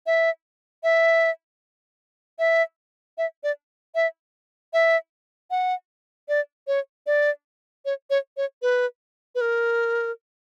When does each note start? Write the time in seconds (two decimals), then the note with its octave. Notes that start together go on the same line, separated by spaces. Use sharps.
0.06 E5
0.83 E5
2.39 E5
3.18 E5
3.43 D5
3.95 E5
4.73 E5
5.51 F#5
6.29 D5
6.67 C#5
7.07 D5
7.85 C#5
8.10 C#5
8.37 C#5
8.62 B4
9.35 B4
9.41 A#4